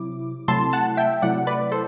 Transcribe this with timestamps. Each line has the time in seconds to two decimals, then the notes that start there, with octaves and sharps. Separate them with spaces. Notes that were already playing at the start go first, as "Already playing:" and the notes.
Already playing: C3 F#3 E4 D6
0.48 C3 F#3 A3 E4 A5 C6
0.73 F#5 A5
0.97 E5 G5
1.22 C3 F#3 A3 E4 D5 F#5
1.47 B4 D5
1.72 A4 C5